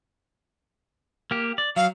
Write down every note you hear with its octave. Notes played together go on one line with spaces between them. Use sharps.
A#3 G4
D5
F#3 F5